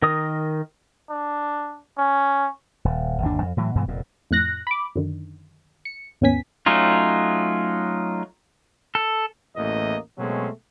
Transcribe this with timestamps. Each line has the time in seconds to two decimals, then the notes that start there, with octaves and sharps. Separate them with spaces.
0.02 D#3 A#4 D#5 D#6
1.10 D4
1.97 C#4
2.85 D#1
3.22 G1 D#2 D#3 D4
3.42 F2
3.57 A2 E3 F#3
3.76 G2 B2 E3 G#3
3.88 F1 F2 A#2
4.31 F2 A2 F#6 A#6
4.67 B5 D6
4.96 F#2 D3 D#3
5.85 C#7
6.21 D#2 G#2 B3 C#4 G#5 B6
6.66 F#3 A3 C#4 D#4 F4
8.95 A4
9.56 A1 E2 A3 A#3 D#5
10.18 B2 F#3 G#3 A3 C4 C#4